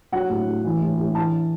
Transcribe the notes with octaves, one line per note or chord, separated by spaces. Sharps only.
F#3 F#5
A2
A2
E3
A2
A2
E3 A5